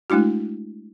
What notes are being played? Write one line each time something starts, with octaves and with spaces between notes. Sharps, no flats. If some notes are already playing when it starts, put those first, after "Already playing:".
G#3 A3 D4 E4 F#4